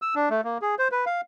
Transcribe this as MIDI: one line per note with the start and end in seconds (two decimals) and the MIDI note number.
0.02 0.15 88
0.15 0.29 62
0.30 0.41 57
0.44 0.58 58
0.62 0.75 68
0.79 0.88 72
0.92 1.05 71
1.06 1.21 77